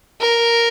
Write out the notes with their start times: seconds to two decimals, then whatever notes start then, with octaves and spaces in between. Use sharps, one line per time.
0.21 A#4